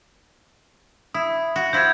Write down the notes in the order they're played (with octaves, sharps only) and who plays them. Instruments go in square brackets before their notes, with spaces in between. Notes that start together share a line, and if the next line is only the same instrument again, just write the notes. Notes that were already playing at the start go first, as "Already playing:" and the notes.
[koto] E4 [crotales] D#6
[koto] F#4
[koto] F3 E4 [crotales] G6 G#6